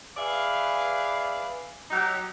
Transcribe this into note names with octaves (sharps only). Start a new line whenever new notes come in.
G#4 B4 D5 E5 F5
F#3 D#4 G4